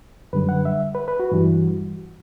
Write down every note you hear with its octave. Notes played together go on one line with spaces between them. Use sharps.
F#2 D3 G3 B4
F#5
E5
B4
B4
F#4
G2 E3 G3